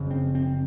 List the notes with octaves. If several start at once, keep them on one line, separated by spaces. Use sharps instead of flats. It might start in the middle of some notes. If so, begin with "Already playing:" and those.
Already playing: F#1 F2 C#3
C4
C4